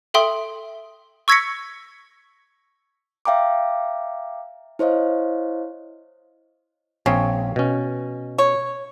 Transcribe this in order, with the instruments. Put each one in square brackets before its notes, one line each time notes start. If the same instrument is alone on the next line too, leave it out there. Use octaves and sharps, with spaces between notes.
[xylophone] A4 E5 G5 C6 D#6
C#6 E6 G#6 A#6 B6 C#7
[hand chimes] E5 F5 G5 A#5 D6
E4 C5 C#5 D#5 F5
[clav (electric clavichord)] A#1 C4 C#5 [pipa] C#3
[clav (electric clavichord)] B2 C#4
[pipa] C#5